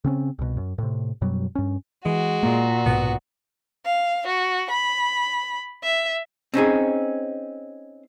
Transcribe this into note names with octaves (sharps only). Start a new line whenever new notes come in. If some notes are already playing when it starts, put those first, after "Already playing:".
C#3 C4 C#4
C2 B2
F#2
A2 C3
F#2 B2 F#3 G3
G2 C#4
E3 G#3 F#4
A#2 A#3
B1 G#2 B2 B3
F5
F#4
B5
E5
C4 C#4 D#4 G#4